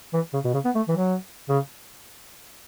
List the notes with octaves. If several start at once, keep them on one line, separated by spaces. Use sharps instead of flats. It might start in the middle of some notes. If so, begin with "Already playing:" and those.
E3
C#3
B2
C#3
B3
A3
E3
F#3
C#3